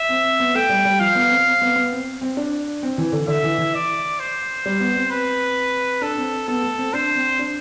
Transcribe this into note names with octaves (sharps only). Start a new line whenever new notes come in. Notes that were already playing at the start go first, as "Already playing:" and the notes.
Already playing: E5
C4
C4
B3
A3 G5
G3
G3
F3 F5
B3
C4
C4
B3
B3
C4
C4
D4
C4
E3
D3
D3 E5
E3
E3
D5
C5
G3
B3
C4
B4
D4 A4
C4
B3 A4
A3
C4
D4 C5
C4
D4